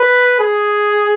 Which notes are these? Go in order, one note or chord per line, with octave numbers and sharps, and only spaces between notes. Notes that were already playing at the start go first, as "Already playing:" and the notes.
Already playing: B4
G#4